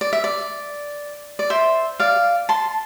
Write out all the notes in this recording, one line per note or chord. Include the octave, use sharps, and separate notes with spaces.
D5
E5
D5
D5
C5 E5
D5 F5
A5 C6